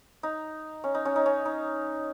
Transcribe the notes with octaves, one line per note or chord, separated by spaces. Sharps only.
D#4
C#4
D#4
C#4
D#4
C#4
D#4